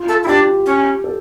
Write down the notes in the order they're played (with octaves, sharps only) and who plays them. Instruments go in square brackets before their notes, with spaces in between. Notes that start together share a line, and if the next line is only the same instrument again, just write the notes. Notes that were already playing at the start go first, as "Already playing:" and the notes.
Already playing: [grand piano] F4
[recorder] A4
E4
[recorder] D4 [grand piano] G4
[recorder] C#4
[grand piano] A4